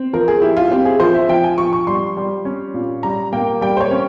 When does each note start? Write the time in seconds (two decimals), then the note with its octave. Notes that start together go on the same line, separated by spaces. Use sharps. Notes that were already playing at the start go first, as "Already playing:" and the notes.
Already playing: C4
0.13 F3 A#4
0.28 G#4
0.42 E4 G4
0.57 F4
0.71 C4 G4
0.85 G#4
1.00 F3 C5
1.15 E5
1.29 F3 G5
1.44 G#5
1.58 F3 C#6
1.73 C#6
1.87 G3 C6
2.17 G3
2.45 C#4
2.74 A#2
3.03 G3 A#5
3.33 A#3 G5
3.61 G3 G5
3.77 C5
3.81 C#5
3.91 C#4